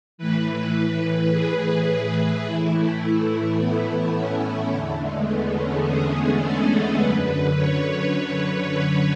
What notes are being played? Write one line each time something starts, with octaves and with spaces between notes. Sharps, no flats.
A2 E3 B4
G#4
A2 E3 E4
A3
A3
B3
C#4
E2 D3 A3
G#3
B3
C#4
G#4
G#4
A4
F#2 D3 B4
C#5
B4